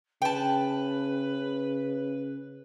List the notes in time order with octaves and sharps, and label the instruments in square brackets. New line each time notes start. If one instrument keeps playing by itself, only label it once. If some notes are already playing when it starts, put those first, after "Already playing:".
[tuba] C#3 [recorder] B4 [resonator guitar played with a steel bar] G5 A5